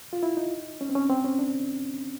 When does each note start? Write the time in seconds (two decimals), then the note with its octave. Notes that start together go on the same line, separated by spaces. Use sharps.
0.13 F4
0.23 E4
0.37 D#4
0.81 C#4
0.89 C4
0.95 C#4
1.10 C4
1.24 C#4
1.39 D4